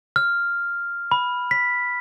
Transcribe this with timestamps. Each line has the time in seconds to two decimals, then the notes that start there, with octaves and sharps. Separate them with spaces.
0.16 F6
1.11 B5
1.51 B6